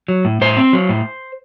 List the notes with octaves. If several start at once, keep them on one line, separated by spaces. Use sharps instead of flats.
F#3
A2
A2 C5
C4
F#3
A2